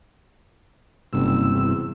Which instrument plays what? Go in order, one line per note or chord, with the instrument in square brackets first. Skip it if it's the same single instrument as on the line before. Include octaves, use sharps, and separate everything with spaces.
[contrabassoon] F#1 [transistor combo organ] G2 C3 E6
[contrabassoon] E2